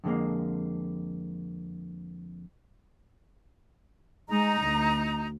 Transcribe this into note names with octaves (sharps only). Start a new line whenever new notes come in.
F2 D3 G#3 A#3
G#3 D#4 A#5
D2